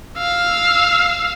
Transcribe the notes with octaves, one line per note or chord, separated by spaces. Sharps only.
F5 E6